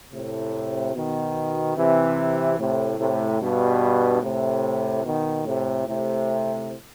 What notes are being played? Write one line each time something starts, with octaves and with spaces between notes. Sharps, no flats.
A2 C3
B2 D#3
C3 E3
A2 C3
A2 C3
G2 B2
A2 C3
B2 D#3
A2 C3
A2 C3